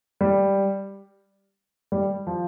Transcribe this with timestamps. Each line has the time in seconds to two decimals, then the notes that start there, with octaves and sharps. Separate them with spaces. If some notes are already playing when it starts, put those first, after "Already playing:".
0.21 G3
1.92 G3
2.27 F3